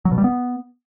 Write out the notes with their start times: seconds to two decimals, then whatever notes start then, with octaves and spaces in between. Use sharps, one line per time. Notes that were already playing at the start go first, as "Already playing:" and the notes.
0.05 F#3
0.12 B2
0.18 G3
0.24 B3